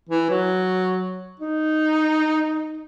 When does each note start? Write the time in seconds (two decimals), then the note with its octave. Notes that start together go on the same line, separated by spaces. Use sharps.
0.09 E3
0.30 F#3
1.40 D#4